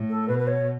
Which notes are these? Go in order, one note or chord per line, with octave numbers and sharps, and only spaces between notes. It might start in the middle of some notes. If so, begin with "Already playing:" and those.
Already playing: A2
A4
B2 B4
B4
C#5